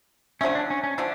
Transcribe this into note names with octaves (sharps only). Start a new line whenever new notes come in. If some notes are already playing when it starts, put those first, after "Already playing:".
D3 F3 A3 C#4
D4
C#4
C#4
D3 F3 A3 D4